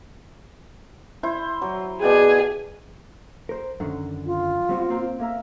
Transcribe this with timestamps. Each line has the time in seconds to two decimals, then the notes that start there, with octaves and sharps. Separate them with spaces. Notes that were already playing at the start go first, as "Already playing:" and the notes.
1.23 E4 C5
1.62 F#3
2.02 B2 G#4 D5 G5
3.49 A#4 C5
3.80 F#2 D3 D#3
4.26 F4
4.69 G3 C4 F#4
4.89 A#3 C4 A#5
5.19 A#3 A#4 E5 A#5